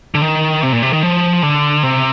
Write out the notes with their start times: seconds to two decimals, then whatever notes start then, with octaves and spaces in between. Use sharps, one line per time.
0.15 D3
0.22 D#3
0.63 C3
0.73 A#2
0.82 C3
0.93 D#3
1.03 F3
1.43 D3
1.83 C3